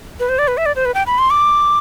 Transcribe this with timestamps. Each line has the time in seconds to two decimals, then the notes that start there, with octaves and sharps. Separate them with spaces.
0.20 B4
0.29 C5
0.39 D5
0.48 B4
0.57 E5
0.66 D5
0.76 C5
0.85 B4
0.95 G5
1.07 B5
1.18 C6
1.30 D6